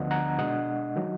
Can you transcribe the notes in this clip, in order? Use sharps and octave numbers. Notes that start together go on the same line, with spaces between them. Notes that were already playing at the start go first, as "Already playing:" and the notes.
Already playing: D2 D3 F3 B3 D4 D#5 F#5
F#5 A#5
B2 G#3 D4 D#5 F#5
D#3 F#3